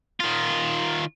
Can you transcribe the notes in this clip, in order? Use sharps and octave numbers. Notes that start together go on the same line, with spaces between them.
D#3 F4